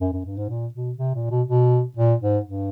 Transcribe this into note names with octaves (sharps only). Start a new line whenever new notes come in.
F#2
F#2
G2
G#2
A#2
B2
C3
A#2
B2
B2
A#2
G#2
G2